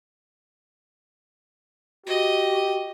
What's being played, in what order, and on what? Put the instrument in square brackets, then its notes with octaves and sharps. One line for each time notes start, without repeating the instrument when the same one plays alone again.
[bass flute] F#4 [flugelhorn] G4 [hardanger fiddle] D#5